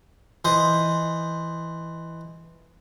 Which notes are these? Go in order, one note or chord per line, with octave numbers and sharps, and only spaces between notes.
E3 C5 D#5